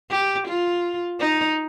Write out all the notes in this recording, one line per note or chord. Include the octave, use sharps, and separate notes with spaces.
G4
F4
D#4